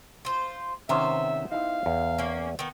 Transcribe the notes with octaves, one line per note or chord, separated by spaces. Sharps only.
F4 C5
C3 D#3 B3 C#4 C5 E5
D#4 E4 F5
E2
A#3 C#4
D#3 B3